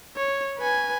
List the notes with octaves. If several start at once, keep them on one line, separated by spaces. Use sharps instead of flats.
C#5
B4 G#5